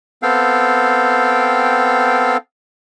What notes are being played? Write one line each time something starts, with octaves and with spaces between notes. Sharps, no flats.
B3 C4 A4 F5 G5